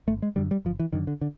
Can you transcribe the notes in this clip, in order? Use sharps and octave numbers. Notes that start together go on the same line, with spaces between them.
G1 A3
G#3
F#2 D3 G3
G3
G1 F3
E3
F#2 D3 D#3
D3
D3